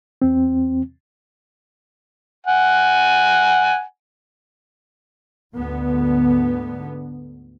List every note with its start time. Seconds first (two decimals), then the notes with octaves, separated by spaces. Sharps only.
0.22 E2 C4
2.46 F#5 G#5
5.54 D2 G#2 D3 B3